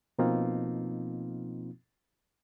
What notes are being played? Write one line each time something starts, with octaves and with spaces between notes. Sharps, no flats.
B2 F3 A#3 C4 D#4 F4